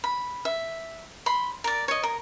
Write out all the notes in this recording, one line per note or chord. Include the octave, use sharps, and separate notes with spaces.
B5
E5
B5 C6
A#4 D5
C#5 D#5
A#4